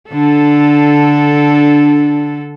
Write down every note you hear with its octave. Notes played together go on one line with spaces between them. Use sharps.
D3 D4 A4